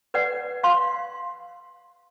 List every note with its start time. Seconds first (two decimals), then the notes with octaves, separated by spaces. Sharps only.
0.14 B4 D5 F#5
0.63 F5 C6